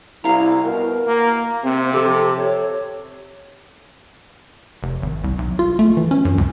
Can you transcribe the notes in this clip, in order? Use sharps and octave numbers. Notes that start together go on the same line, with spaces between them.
C2 E4 F5 A#5
B2 A#4
A#3
C3 C4
F3 G4 A4
C#5
F1
G#1
C2
B1
F4
A3
E3
C#4
F#2
C#2